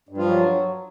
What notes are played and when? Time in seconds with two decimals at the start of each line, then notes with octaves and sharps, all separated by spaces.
0.09 G2
0.17 F3 F4
0.27 F#3